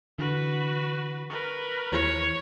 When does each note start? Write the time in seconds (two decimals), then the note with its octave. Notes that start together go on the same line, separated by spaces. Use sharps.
0.19 D3 E3 F#4 B4
1.30 A#4 B4 C#6
1.92 D#2 E3 C#5